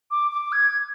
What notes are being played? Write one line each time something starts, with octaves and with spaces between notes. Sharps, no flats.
D6
D6
G#6